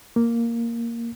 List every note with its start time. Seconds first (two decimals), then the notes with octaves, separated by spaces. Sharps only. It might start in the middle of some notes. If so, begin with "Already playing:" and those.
0.16 A#3